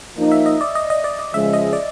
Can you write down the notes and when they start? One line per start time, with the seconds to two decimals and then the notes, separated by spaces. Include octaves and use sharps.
0.16 F3 A#3 D#4
0.32 E5
0.46 D#5
0.61 D5
0.75 D#5
0.90 D#5
1.04 D5
1.19 D#5
1.34 C#3 F3 G#3 E5
1.53 D#5
1.73 D5